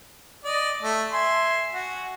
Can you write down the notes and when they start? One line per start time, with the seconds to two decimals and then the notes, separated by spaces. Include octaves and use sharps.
0.44 D5 D#5
0.82 A3
1.12 E5 G#5 C6
1.73 F#4